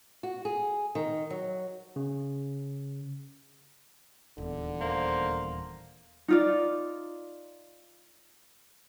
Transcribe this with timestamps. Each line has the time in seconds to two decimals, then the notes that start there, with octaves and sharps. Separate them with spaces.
0.23 F#4
0.45 G#4
0.95 D#3
1.30 F#3
1.96 C#3
4.38 D#1 E2 D3
4.81 A#3 C5
6.28 D#4 F4 D5